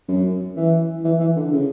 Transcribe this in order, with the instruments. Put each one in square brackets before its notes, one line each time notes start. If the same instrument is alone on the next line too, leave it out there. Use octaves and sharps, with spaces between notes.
[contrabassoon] F#2
E3
E3
E3
D3
C#3